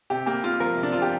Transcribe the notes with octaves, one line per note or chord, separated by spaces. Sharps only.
C3 G4
A#3 G4
A#3 F4
F3 A#4
C3
D4
F3 F4
G4